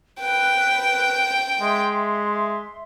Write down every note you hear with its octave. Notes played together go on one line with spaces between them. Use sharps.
B4 G5 F#6
G#3 E5 C6